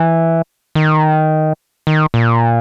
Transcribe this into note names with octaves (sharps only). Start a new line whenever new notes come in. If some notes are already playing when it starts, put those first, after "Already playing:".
Already playing: E3
D#3
D#3
A#2